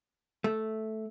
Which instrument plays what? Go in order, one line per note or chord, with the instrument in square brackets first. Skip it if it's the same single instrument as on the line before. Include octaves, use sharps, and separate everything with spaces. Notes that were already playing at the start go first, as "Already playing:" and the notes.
[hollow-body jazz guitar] A3